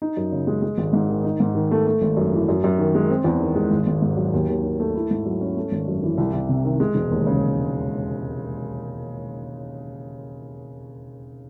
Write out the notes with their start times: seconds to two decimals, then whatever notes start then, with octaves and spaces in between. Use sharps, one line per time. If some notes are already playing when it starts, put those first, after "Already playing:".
0.02 D#4
0.17 F#2
0.32 C#3
0.47 G#3
0.62 G#3
0.78 G#1
0.93 G#2
1.09 D#3
1.24 D#4
1.40 G#2
1.55 D#3
1.71 A3
1.87 A3
2.02 G#1
2.17 F#2
2.33 E3
2.48 F#2
2.64 F#2
2.79 D#3
2.95 G#3
3.10 C4
3.24 E2
3.41 D#3
3.55 G#3
3.71 G#1
3.87 G#1
4.02 G#2
4.17 F#3
4.33 D#2
4.49 D#2
4.63 D#3
4.80 A3
4.95 E4
5.11 G#2
5.26 F#3
5.41 C#4
5.57 A3
5.72 G#1
5.88 F#2
6.03 E3
6.18 C2
6.33 C2
6.49 C3
6.64 D#3
6.80 G#3
6.95 E1
7.11 D#2
7.27 C#3